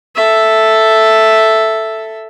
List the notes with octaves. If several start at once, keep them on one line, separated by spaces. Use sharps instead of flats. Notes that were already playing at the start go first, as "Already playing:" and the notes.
A4 E5